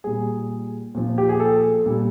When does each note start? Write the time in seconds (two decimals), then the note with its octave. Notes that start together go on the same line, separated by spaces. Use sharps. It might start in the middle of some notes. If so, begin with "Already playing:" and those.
0.04 A#2 G3 G#4
0.95 A#2 F3
1.18 G4
1.29 G#4
1.40 A4
1.86 A#2 G3